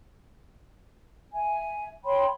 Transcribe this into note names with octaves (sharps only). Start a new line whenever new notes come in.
E5 G#5
C#5 G5 B5 C6